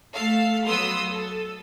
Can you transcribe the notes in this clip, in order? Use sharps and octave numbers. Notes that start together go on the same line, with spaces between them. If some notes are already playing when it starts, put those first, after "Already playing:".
A3 A4 F5
F#3 B3 C6 D#6 E6
A4